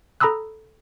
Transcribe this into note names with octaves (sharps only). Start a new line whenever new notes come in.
A4 A#5 B5 D#6 E6 F#6